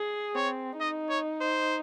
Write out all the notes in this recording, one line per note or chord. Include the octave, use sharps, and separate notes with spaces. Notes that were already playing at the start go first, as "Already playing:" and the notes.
Already playing: G#4
C4 C#5
D#4 D#5
C#5
C5